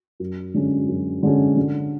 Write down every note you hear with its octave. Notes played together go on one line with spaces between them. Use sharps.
F#2
D3 G#3 C#4
F#2
D3 G#3 C#4
D3